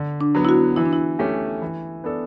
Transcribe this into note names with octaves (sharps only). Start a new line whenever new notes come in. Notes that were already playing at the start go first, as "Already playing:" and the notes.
Already playing: D3
D4
F#3 B3
E4
F#4
E3 E4
D4
E4
A3 C#4 G4
E3
B3 D4 A4